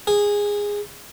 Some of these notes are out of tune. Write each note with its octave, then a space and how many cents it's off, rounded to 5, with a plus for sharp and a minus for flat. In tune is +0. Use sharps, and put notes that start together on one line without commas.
G#4 -15